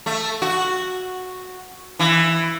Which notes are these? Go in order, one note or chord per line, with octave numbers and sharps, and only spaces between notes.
A3
F#4
E3